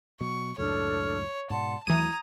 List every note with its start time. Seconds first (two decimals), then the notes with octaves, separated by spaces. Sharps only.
0.21 B2 F#3 C#6
0.58 C#2 F#2 A2 D4 A4 C#5 F6
1.50 G#2 B2 D5 F#5 A5 C6
1.87 D#2 E3 F#3 A3 A#5 D#6 G#6 D#7